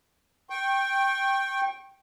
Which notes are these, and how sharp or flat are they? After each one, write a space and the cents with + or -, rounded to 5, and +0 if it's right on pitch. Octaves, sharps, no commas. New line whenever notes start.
G5 +0 C#6 -30